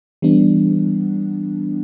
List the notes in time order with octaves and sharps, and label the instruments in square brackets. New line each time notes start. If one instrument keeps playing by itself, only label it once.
[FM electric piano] E3 G3 B3 D4